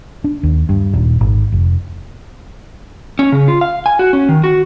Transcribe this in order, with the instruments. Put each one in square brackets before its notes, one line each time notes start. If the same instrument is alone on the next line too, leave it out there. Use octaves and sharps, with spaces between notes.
[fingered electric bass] D4
D#2
G2
D#1
G#1
F1
[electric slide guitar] C#4
C#3
F4
F5
G#5
F#4
C#4
D#3
F#4